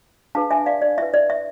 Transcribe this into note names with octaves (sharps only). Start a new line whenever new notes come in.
D4 G#4 B4 F5 A5
E5 G#5
D5 F5
D5
E4 B4 E5
D5
E5